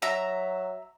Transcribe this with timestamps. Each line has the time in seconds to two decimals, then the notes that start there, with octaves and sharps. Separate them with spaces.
0.02 F#3 E5 A#5